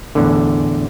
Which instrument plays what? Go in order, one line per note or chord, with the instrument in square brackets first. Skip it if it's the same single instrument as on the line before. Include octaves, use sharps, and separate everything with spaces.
[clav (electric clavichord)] E2 A2 D3